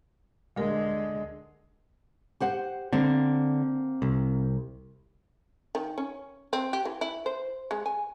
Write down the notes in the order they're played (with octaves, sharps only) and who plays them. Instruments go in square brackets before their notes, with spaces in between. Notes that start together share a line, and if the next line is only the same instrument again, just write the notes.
[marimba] D2 A#4 [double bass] D3 G#3
[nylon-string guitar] G4 C5 F#5
[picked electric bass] D3 [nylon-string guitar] A#3 C4 C5
[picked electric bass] C2
[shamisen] D#3
C#4
C4
G4
E3
E4
C5
G#3
G#5